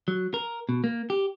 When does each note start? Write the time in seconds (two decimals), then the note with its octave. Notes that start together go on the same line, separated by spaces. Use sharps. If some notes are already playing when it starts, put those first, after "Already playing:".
0.08 F#3
0.34 A#4
0.69 B2
0.84 A#3
1.10 G4